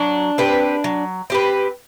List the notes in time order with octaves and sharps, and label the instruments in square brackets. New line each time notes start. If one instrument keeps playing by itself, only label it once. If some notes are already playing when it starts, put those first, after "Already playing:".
Already playing: [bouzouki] F#3 [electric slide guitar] D4
[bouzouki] C4 G4 B4
F#3
C4 G4 B4